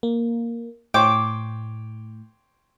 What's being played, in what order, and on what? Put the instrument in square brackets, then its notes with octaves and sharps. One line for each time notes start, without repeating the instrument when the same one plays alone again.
[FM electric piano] A#3
[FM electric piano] A2 [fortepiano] C5 C#5 G5 [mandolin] D6